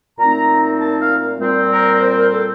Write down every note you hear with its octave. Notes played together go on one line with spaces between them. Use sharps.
A#2 A3 C4 D#4 A#5
A5
F5
A#2 G3 C4
A#4
A#4
C5
A#4
A4